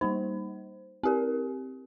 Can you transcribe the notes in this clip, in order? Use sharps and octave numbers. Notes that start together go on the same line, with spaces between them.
G3 A#3 D#4 C5
C4 G4 A#4